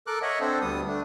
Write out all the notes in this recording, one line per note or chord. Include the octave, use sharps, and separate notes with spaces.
A4 A#4 D6 F#6
C#5 D#5 E5 F#5
C4 D4 A4 C5
D2 G3 B3 D#6
A3 D4